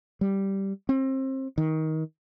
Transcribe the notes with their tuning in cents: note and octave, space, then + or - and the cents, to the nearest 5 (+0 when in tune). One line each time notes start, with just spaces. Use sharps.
G3 -5
C4 +30
D#3 +20